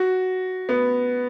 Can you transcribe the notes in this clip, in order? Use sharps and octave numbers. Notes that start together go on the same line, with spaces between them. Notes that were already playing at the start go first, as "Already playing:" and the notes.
Already playing: F#4
B3